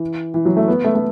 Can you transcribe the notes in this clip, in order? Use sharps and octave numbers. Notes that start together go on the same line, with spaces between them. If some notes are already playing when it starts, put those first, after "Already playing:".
Already playing: E3
E3
F#3
A3
B3
A3
A3